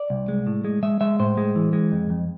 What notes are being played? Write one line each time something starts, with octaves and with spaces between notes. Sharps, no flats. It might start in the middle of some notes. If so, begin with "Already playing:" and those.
Already playing: D5
C2
G#3
A2
G#3
G#3 E5
G#3 E5
A2 C5
G#3
E3
G#3
F2
F2